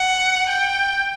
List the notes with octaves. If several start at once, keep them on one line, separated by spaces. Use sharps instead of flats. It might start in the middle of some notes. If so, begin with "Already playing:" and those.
Already playing: F#5
G5